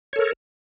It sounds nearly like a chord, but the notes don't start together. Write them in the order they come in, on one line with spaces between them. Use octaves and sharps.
C#5 A4 A#4